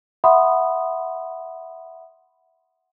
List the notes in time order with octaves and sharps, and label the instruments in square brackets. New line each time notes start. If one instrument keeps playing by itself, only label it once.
[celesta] E5 F#5 B5 C6 D#6